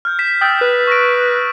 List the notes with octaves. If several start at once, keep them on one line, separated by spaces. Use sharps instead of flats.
F6 G6
B6 E7
G5 D#6 E6 A6
B4
C#6 A#6 D7